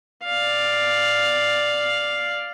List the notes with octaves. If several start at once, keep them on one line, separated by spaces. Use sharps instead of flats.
D5 F5